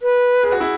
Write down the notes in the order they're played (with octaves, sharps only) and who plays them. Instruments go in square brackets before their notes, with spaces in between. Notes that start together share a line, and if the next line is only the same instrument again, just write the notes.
[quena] B4
[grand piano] G#4
F#4
E4